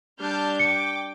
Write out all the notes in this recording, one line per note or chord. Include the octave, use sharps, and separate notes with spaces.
G3 D4 A5 F6 G6
G5 D6 C#7